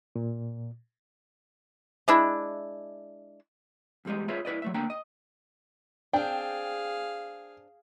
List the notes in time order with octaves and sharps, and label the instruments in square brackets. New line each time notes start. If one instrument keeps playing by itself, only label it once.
[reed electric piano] A#2
[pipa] G#3 D4 E4
[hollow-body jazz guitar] E2 G2 G3 G#3 D#5
F4 G#4 B4 C#5 E5
E4 B4 D5 D#5
F#3 A3 E5
D2 A#3 D4 G5 A#5
D#5
[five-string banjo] C4 D4 [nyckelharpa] G#4 F5 [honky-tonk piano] G5